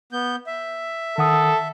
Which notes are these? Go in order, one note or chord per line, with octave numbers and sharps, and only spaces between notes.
B3 G6
E5
D#3 A4 F#5 D#6